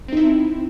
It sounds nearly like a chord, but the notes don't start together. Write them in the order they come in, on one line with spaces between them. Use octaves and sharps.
C4 D#4 E4